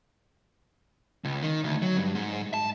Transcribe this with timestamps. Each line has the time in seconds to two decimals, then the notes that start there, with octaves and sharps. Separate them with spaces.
1.25 C#2
1.43 D#3
1.64 D2
1.82 F#3
1.97 G2
2.15 G#2
2.54 A5